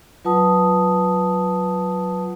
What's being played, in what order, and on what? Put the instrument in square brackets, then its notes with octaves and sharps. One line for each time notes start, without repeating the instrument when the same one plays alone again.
[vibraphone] F#3 F4 B4 F#5 A5 D#6